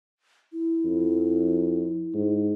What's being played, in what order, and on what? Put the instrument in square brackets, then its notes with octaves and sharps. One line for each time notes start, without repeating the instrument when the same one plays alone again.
[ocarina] E4
[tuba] F2
G#2